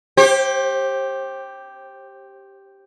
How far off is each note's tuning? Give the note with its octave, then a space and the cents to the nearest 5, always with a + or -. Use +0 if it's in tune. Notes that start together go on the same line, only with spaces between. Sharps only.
G4 +0 C5 +35